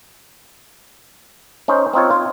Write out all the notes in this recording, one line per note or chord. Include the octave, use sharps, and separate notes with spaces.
C#4 D#4 C5
C4 D#4 F4 C#5
F4